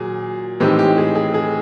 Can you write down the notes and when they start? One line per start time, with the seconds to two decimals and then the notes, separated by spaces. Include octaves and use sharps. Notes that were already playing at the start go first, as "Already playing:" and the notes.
Already playing: A#2 F#3 G#4
0.60 A2 E3 G#3 C4 D#4 G4
0.79 G4
0.98 G#4
1.15 G#4
1.34 G#4